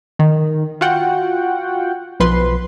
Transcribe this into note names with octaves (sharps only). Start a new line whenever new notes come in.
D#3
F4 F#4 F#5 G5
B1 F3 B4 C6